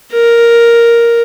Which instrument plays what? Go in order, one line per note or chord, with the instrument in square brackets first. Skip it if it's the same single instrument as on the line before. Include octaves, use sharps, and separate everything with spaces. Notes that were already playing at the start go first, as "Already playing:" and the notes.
[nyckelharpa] A#4